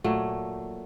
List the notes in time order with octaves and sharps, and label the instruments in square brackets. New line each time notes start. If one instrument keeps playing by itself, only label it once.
[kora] A#2 F#3 A3